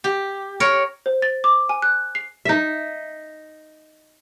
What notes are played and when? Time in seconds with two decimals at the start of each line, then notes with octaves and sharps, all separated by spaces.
0.04 G4
0.60 A#4 C#5
1.06 C5
1.22 A6
1.44 D6
1.69 G#5
1.82 F#6
2.15 C7
2.45 D#4 E5